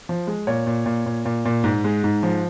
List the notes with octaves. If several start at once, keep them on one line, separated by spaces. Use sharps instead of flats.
F3
G#3
A#2 C#5
A#2
A#2
A#2
A#2
A#2
G#2
G#3
G#2
F3